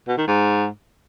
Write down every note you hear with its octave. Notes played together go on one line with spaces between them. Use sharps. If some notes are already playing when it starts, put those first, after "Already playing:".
B2
D#3
G#2